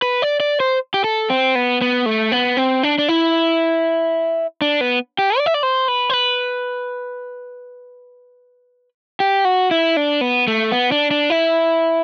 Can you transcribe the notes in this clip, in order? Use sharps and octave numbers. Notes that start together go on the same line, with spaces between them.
B4
D5
D5
C5
G4
A4
C4
B3
B3
A3
B3
C4
D4
D4
E4
D4
B3
G4
D5
E5
D5
C5
B4
C5
B4
G4
F#4
E4
D4
B3
A3
B3
D4
D4
E4